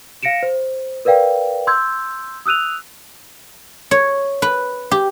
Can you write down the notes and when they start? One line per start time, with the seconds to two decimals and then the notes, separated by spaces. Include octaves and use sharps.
0.23 F5 A#6 C#7 D7 E7
0.43 C5
1.05 A#4 B4 D5 F5 G5
1.67 C6 E6 G6 G#6
2.46 D#6 E6 F#6 D#7 F7
3.91 C#5
4.42 B4
4.91 G4